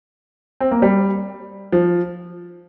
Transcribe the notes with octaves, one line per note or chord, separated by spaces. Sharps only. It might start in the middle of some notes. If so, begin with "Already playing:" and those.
C4
A#3
G3
F3